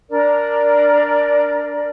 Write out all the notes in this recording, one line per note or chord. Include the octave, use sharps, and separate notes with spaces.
D4 A#4 D5